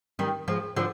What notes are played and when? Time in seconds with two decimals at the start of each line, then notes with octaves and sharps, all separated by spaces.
0.19 D#3 G3
0.48 F3 G#3
0.76 D3 F3